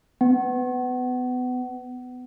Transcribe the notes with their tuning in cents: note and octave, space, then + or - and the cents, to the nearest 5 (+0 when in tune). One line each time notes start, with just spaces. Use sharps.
B3 +25